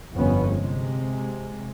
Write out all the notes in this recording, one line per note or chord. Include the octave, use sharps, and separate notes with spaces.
G1 F2 B3 C#4
C3 G#3